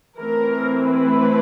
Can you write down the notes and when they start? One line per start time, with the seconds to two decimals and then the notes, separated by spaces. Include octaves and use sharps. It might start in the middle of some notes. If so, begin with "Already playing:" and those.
0.19 E3 A3 C4 A#4
0.84 B4